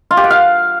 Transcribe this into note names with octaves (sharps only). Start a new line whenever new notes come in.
F4
G4
F#5
F5